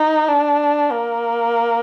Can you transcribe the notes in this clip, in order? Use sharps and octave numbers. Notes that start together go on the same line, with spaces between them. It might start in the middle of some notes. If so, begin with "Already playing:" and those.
Already playing: D#4
D4
A#3